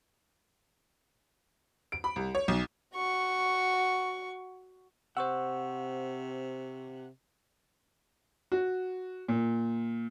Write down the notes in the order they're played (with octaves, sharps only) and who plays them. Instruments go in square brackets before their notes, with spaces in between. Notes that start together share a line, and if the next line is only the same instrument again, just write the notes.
[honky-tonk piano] D7
B5
C2
C#5
B1
[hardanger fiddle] F#4 C#6
[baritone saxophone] C3 [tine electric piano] C5 C#6 E6 [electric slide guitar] F#5
[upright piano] F#4
A#2